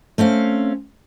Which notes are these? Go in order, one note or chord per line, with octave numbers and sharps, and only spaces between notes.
A3 C4 C#4 F5